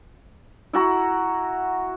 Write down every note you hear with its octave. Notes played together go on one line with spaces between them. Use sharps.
E4 F#4 A#5